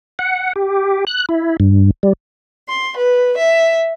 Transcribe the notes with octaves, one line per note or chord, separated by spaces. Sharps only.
F#5
G4
F#6
E4
G2
G3
C6
B4
E5